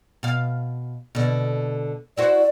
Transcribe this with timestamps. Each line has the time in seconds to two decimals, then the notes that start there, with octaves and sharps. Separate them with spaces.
0.23 B2 F5
1.15 B2 D3
2.17 E4 F#4 C5 D5